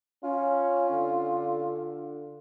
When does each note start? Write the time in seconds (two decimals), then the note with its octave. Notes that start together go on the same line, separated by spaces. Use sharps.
0.23 C#4 F4
0.90 D3